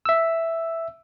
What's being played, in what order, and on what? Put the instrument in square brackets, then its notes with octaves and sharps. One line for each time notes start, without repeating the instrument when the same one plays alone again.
[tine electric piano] E5 E6